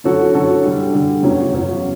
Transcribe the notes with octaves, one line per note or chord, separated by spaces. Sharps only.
D3 F#3 C#4 F#4 A4
D3 F#3 C#4 F#4 A4
D3 G3 D4
D3 G3 D4
E2 C#3 F#3 C#4
E2 C#3 F#3 C#4